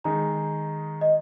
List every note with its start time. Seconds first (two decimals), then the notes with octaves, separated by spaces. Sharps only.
0.04 D#3 G#3 D#4 G#4 A#5
1.01 D#5